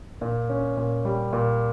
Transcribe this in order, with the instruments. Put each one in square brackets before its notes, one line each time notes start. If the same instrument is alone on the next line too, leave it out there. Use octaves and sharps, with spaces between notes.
[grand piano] A#2
C#4
A#2
G3
A#2